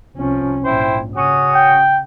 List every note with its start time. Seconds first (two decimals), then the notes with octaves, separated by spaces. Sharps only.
0.15 C2 F3 C#4
0.64 A#1 G#2 E4 C5 G5
1.15 C#3 C#4 F#4 D#6
1.54 G5